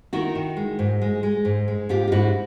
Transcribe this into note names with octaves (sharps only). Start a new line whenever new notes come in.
D#3 E4 F#4
D#3
G#3
G#2
G#3
G#3
G#2
G#3
G#2 F4 G4
F4
G#2 E4 F#4